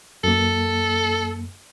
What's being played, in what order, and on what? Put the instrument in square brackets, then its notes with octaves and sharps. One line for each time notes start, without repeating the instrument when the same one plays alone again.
[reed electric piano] F#2 A#3 [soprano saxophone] A4